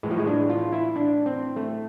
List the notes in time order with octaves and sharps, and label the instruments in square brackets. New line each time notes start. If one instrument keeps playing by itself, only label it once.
[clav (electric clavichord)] A2 E3 G#3
F3
G#3
D4
F4
E4
D4
C4
A3